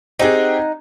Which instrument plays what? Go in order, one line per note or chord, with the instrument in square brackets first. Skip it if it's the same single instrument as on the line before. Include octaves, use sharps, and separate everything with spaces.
[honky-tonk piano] C4 G4 G#4 [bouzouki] D#4 F#5